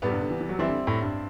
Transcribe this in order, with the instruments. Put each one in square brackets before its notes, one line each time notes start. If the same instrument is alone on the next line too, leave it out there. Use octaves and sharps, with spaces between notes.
[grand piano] A2 [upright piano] C3 G3 B3
[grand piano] G2
D3
E3
E3
F#3
[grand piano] E3 [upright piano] G3 C4 E4
[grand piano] D3
A2
G2